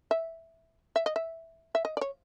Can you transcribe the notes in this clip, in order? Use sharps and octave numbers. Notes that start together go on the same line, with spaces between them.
E5
E5
D#5
E5
E5
D#5
D5
C#5